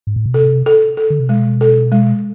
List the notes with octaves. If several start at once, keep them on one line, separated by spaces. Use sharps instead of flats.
G#2
A2
B2
C3 A4
A4
A4
D3
C3
B2 G#3
A4
G#3